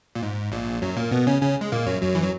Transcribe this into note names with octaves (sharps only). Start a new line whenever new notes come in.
A#2
G#2
A#1 A#2
F#2 F#3
A#2 A#3
B2 B3
C#3 C#4
C#3 C#4
G#3
A#2 A#3
F#2 F#3
F#2 F#3
E3
F#3